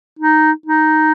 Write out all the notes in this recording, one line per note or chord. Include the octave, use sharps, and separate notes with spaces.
D#4
D#4